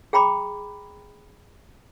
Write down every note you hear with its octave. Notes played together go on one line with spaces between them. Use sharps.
G#4 G5 A#5 B5 D6